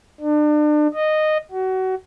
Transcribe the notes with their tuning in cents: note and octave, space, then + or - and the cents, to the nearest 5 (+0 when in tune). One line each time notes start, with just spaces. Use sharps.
D4 +35
D#5 -10
F#4 +25